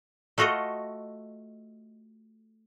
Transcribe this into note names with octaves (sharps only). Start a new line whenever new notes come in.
A3 F4 F#4 A4 D#5